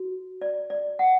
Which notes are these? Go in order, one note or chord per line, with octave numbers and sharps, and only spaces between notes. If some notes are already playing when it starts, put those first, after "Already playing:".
Already playing: F#4
D5
D5
F#5